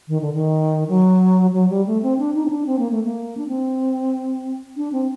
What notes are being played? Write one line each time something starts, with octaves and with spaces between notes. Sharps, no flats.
D#3
D3
D#3
F#3
F#3
G3
A3
C4
D4
D#4
C4
D4
C4
A#3
A3
A#3
D4
C4
D4
C4